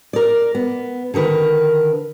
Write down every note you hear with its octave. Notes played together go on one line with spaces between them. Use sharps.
A#4 D5
B3
D3 D#3 A#4 B4